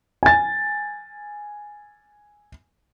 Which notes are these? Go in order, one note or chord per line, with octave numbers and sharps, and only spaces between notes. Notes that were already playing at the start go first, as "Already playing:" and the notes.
G#5 A6